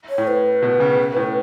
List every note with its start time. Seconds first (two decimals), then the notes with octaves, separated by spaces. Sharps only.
0.09 C#5
0.18 A2
0.28 B4
0.63 B2
0.80 C#3
1.16 A2